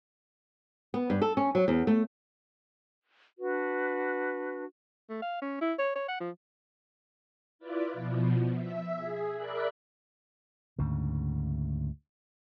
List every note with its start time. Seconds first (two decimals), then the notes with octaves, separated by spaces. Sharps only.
0.94 B3
1.10 G2
1.22 A4
1.37 C#4
1.55 F#3
1.68 E2
1.87 A3
3.39 D4 F#4 B4
5.09 A3
5.22 F5
5.42 C#4
5.61 E4
5.79 C#5
5.95 C#5
6.08 F#5
6.20 F3
7.59 E4 F4 B4 D5
7.92 B2 F3
8.52 E5
8.95 G#4
9.36 A#4 D5 E5 B5 F#6
10.79 D2 G#2 C#3